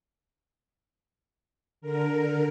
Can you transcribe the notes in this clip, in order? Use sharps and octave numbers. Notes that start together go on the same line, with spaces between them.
D3 A#4